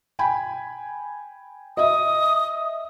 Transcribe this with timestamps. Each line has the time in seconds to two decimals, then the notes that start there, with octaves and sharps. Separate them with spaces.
0.19 G5 G#5 B5
1.77 D#5 E5 D#6